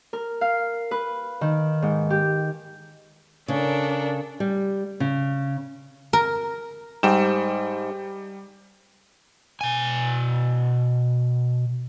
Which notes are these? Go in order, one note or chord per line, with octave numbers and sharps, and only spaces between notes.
A#4
F5
B4
D#3
G#2
G4
C#3 D4 A4 A#4
G3
C#3
A#4
G#2 G3 G5 E7
B2 G#5